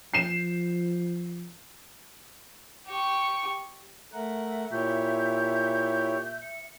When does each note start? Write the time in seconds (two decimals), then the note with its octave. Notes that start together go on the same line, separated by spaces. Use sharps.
0.14 F3 C7 E7
2.87 G4 C#6
4.13 A3 A#4 E5 F#5
4.72 A#2 E4 G4 C#5 G6
6.41 C#7